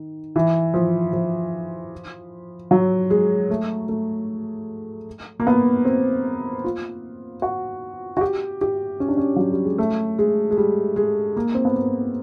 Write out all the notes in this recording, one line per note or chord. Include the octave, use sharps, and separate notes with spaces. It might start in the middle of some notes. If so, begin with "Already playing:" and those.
Already playing: D#3
E3
F3
F3
F#3
G#3
A3
A3
A#3
B3
C4
F4
F#4
F#4
G4
G4
C#4
D4
C#4
F#3
G3
G#3
A3
G#3
G#3
G3
G#3
A#3
C4
B3
A#3